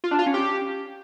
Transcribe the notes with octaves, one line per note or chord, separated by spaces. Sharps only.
F4
D4
F4
C#4
G4